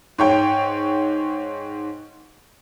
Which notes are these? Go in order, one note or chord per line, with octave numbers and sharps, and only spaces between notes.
G#2 C#5 G5